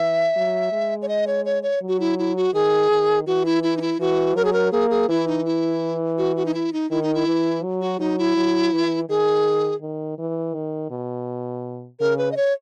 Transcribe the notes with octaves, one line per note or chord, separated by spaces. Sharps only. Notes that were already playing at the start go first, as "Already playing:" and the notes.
Already playing: E3 E5
F#3
G#3
C#5
D#5
C#5
C#5
C#5
F#3
F#4
E4
E4
F#4
D#3 G#4
D#3
E3 F#4
E4
E4
D#4
E4
E3 F#4
F#3 A#4
G#4
A#4
A#3 G#4
G#4
E3 E4
D#4
E4
F#4
F#4
D#4
E4
D#4
D#3 E4
D#4
E4
E3
F#3
F#4
F#3 D#4
E4
F#3
E3
D#3 G#4
D#3
E3
D#3
B2
C#3 A#4
B4
D#5
C#5